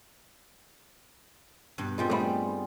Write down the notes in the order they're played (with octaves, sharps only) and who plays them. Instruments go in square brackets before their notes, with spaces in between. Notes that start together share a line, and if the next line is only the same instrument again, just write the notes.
[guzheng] G2 B2
[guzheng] A#2 G3 G5 [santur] G#3 C4 F4
[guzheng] G3 B3 [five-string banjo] A3 B5